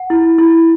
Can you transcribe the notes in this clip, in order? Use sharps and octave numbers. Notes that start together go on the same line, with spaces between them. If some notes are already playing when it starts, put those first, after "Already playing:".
Already playing: F#5
E4
E4